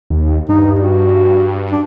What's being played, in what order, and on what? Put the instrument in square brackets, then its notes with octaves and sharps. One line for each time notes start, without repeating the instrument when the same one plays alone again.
[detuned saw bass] D#2
[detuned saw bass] G2 [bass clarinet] D#4
[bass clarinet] F#4
D4